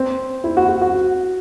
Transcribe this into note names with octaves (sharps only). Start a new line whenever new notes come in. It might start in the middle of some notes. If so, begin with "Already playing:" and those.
Already playing: C4
E4
F#4
F#4
F#4